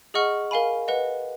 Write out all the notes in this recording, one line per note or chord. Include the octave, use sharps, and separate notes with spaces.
G#4 D#5 F#5 C#6 F6
A#4 F5 G#5 B5
B4 D#5 F#5